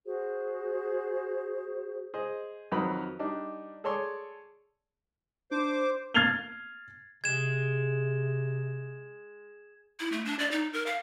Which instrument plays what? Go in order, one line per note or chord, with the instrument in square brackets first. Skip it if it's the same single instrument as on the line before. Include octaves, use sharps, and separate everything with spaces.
[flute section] F#4 G#4 C5
[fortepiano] G#4 C5 D#5
F2 D#3 F#3 B4 B5 D#6
G3 D4 D#4
G#4 A4 C#5 D5 C6 C#6
[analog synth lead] D4 [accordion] C5 D6
[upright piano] F6 G#6 A6 C7 F7 G7
[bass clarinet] C3 [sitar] G#3 [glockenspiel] G#6 E7
[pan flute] E4
A3
D4
D5
D#4
A#4
F5